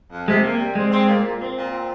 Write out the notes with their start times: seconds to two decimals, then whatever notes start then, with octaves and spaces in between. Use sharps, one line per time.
0.11 F2
0.27 C3 G#3
0.44 C3 A#3
0.59 G3
0.75 G#3 C4
0.92 C4
1.08 A#2
1.24 A#2
1.40 C4
1.56 A#2
1.72 C4